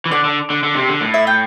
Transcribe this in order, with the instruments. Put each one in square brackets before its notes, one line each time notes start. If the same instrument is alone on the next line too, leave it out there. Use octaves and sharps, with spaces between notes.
[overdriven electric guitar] E3
[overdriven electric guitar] D3 [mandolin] D5
[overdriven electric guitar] D3
D3
D3
C3
D3
A2
[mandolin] E5
G5